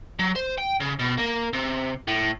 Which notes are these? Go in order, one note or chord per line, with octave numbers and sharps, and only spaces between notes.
F#3
C5
G5
C#3
B2
A#3
C3
A2